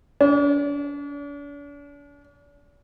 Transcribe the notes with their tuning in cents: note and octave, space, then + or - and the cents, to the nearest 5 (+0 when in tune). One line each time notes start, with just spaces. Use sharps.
D4 -45